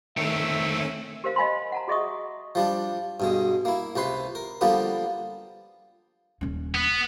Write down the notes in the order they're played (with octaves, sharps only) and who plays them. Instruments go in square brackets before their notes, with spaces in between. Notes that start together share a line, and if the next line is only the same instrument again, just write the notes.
[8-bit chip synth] D#3 A3 [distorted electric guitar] C4 C#5 [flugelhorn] E5
[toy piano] G4 A#4 C5 F5
D#5 F5 G#5 B5 C6
F#5 A5 A#5
F#4 G#4 D#5 E5 C#6 D#6
[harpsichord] F3 G3 D4
G2 B2 G#3
A#3 E4
C#2 C3 B4 C6
A#4
D3 F3 G3 A#3 B3
[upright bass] D#1 C#4
[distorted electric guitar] B3